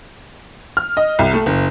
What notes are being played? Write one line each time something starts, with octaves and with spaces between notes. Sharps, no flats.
F6
D#5
C2
A3
F#1